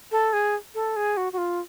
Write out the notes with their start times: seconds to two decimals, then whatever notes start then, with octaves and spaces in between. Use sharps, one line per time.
0.11 A4
0.33 G#4
0.74 A4
0.96 G#4
1.17 F#4
1.32 F#4
1.38 F4